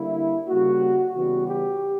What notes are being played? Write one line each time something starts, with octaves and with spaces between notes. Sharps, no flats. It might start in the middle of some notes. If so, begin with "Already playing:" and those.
Already playing: D3 G3 A#3 E4
C#3 G3 A#3 F#4
C#3 E3 G3 B3 F#4
G4